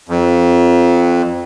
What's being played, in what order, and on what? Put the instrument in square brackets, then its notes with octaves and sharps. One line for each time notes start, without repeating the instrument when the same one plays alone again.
[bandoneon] F2